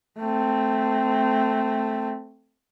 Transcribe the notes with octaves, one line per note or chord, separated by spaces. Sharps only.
A3 C4